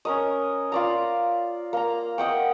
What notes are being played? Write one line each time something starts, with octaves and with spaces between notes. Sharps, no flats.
C#4 A#4 D#5
F4 D5 A#5
A#3 A#5
A#4 D#5 F#5 G5